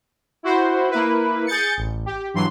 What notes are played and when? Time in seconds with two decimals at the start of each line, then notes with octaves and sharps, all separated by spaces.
0.43 E4 F#4 C5
0.90 A#3 E4 B4
1.46 G#4 G6 A6 C#7
1.77 A1
2.06 G4
2.34 G2 E3 F#3 C6